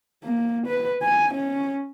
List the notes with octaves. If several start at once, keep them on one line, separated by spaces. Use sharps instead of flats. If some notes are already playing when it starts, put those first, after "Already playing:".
A#3
B4
G#5
C#4